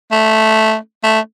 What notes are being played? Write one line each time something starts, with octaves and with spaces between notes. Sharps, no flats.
A3
A3